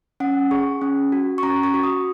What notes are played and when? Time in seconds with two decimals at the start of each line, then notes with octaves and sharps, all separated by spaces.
0.20 C#4 F#5
0.51 G#4 C#6
0.81 C#4
1.12 F#4
1.38 C#6
1.43 C#4 A#5
1.63 C#6
1.74 F#4
1.83 D#6